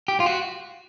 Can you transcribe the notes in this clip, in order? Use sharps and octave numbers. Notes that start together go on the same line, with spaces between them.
G4
F4
F#4